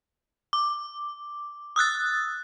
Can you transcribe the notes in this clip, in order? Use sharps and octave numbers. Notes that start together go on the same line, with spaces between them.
D6
D#6 E6 F#6 A6